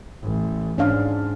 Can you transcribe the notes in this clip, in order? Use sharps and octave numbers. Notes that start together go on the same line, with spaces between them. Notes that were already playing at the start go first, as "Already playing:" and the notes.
A1
G#2 C#4 D4 F5